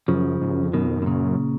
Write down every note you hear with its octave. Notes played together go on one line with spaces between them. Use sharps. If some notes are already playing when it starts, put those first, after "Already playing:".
F#2 C#3 F3
G#2
F#2
F2
F#2 B2 D#3
F2
F#2
B2
A#2 C#3